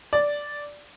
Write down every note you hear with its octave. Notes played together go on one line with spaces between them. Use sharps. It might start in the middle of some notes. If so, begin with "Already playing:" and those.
D5